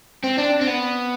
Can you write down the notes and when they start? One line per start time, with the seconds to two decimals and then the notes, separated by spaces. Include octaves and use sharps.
0.24 C4
0.38 D4
0.61 C4
0.67 B3